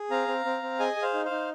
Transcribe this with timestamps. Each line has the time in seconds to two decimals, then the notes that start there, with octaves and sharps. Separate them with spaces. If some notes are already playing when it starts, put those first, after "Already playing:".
Already playing: G#4
0.10 C4 F5 A#5
0.28 C4
0.45 C4
0.63 C4
0.79 G#4 D#5 G#5
0.96 G#4
1.02 C5 F5
1.14 D#4
1.25 C5 F5
1.31 D#4